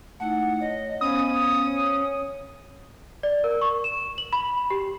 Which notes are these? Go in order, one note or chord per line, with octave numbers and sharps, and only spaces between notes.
A3 D#4 E4 F#5
C#5 D#5
B3 C#4 C5 F5 D#6
C#5
D5
A#4
C#6
E7
F#7
B5
G4